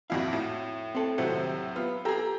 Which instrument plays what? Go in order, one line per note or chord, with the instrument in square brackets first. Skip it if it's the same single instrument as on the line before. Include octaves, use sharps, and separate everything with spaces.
[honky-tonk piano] A#1 F2 E4 [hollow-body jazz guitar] F#4 F5
[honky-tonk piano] A2
[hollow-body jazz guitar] C4 A4
[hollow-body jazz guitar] D#2 C5 F#5 [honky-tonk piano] A2 C3 F#3
[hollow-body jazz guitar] B3 [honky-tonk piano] F4
[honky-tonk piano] G4 A#5 [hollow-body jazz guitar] A4 G#5